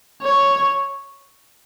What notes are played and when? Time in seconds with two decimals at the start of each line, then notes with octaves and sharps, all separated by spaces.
0.22 C#5